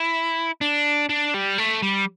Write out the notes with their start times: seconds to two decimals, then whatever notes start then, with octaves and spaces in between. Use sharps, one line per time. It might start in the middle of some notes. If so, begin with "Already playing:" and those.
Already playing: E4
0.61 D4
1.09 D4
1.34 G3
1.58 A3
1.82 G3